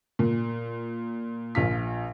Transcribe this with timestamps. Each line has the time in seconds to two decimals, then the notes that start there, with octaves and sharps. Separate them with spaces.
0.19 A#2
1.55 A#1 F4 B6